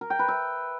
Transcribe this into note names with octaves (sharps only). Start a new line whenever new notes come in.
A#4
G5
B4
E5